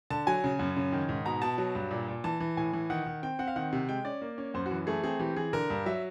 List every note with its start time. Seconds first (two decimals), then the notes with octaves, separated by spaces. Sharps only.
0.10 D3 A5
0.27 F#3 G#5
0.44 C#3
0.59 F#2
0.77 C#3
0.92 D#3
1.09 G#2
1.25 B2 A#5
1.42 B2 A5
1.58 F#3
1.75 G2
1.91 A#2
2.08 A#2
2.24 E3 A5
2.40 E3
2.57 A2 G#5
2.73 E3
2.90 D#3 F#5
3.06 D#3
3.23 C4 G5
3.39 C4 F#5
3.48 F5
3.56 D#3 F#5
3.73 C3
3.89 G#3 G5
4.05 C#4 D5
4.22 A#3
4.38 C#4
4.54 F#2 C5
4.66 F#4
4.71 E3
4.87 A3 G#4
5.04 C4 G#4
5.20 E3 G4
5.36 E3 G#4
5.53 D3 A#4
5.70 G2
5.86 F#3 E5